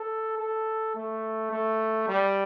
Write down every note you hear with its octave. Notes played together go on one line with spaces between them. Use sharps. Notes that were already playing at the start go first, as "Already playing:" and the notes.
Already playing: A4
A4
A3
A3
G3